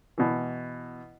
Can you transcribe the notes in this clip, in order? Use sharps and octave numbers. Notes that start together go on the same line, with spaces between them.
B2 E3